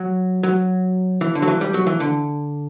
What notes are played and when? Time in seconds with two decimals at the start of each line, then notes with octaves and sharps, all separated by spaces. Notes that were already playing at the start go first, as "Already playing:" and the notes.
Already playing: F#3
0.43 F#3
1.21 E3
1.35 D3
1.42 F#3
1.48 E3
1.61 G3
1.74 F#3
1.87 E3
2.00 D3